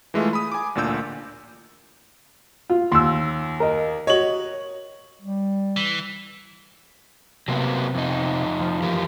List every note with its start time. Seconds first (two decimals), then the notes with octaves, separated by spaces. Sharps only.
0.14 E3 G#3 A3 E4 F4
0.33 B5 D#6
0.52 G#5 D6
0.75 A1 D2 A#2 D4 E6 G6
2.70 F4
2.92 D#2 C6 E6
3.60 A#4 D#5
4.07 F#4 C#5 D#5 F#7
5.21 G3
5.77 E3
7.48 C3 F#3 A#3 B3
7.95 F2 D#4
8.60 F3
8.82 E3 G4 A#4